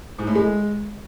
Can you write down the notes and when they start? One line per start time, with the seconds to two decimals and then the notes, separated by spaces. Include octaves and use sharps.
0.19 G#2
0.27 A2
0.35 G#3